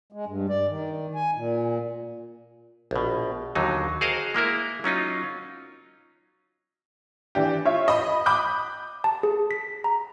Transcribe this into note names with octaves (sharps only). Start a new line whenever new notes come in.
G#3
G2
D5
D#3
G#5
A#2
A#1 B2
D#2 D3 F#3 D#4
F#4 G#4 A#4 C5 D#5 F5
G#3 A#3 E4 A#4
F#3 C#4 D#4 F4
E3 D4 G4
F4 C#5 E5
D#5 B5 D#6
B5 D6 D#6 F#6 G6
A5
G#4
B6
A#5